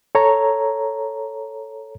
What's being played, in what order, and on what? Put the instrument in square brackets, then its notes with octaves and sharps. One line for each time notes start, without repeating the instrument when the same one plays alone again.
[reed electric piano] A4 C#5 A#5